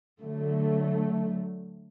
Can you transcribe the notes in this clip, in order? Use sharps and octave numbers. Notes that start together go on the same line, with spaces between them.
D3 F#3 A3